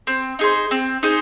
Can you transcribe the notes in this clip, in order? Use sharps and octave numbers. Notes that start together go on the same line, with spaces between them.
C4
D#4 G#4 C5
C4
D#4 G#4 C5